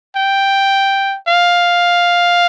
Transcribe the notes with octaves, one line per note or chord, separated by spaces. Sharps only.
G5
F5